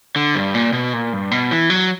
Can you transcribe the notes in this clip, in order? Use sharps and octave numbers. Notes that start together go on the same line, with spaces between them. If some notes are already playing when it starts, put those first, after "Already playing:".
D3
G2
A#2
B2
A#2
G2
B2
E3
F#3